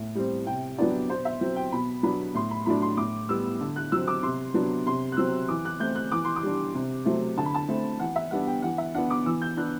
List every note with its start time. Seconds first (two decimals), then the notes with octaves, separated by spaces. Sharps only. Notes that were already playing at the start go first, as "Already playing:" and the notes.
Already playing: A2
0.15 G3 C4
0.47 C3 G5
0.78 F#3 B3 D4 D5
1.10 B2 C5
1.25 E5
1.41 F#3 C4
1.56 G5
1.72 B2 B5
2.03 F#3 B3 D4 B5
2.34 A2 C6
2.51 B5
2.66 F#3 A3 D4 B5
2.82 C6
2.97 A2 D6
3.29 G3 B3 E6
3.60 D3
3.76 F#6
3.92 F#3 C4 E6
4.07 D6
4.23 C3 C6
4.54 F#3 B3 D4
4.86 C3 C6
5.12 F#6
5.17 F#3 C4 E6
5.48 E3 D6
5.65 F#6
5.80 A3 C4 G6
5.95 F#6
6.12 E3 D6
6.24 C6
6.36 D6
6.43 G3 D4
6.74 C3
7.05 F#3 A3 C4
7.37 D3 A5
7.46 B5
7.54 A5
7.68 A3 C4
7.99 E3 F#5
8.16 E5
8.31 G3 B3 D4 F#5
8.47 G5
8.62 E3 F#5
8.78 E5
8.94 B3 D4 F#5
9.10 D6
9.26 E3 E6
9.42 G6
9.57 B3 D4 F#6